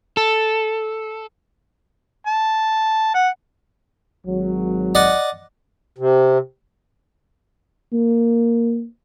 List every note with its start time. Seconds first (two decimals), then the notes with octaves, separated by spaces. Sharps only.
0.17 A4
2.27 A5
3.15 F#5
4.26 G#1 F#3
4.95 D5 D#5 F#5
5.98 C3
7.93 A#3